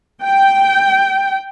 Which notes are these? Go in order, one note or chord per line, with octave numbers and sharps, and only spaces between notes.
G5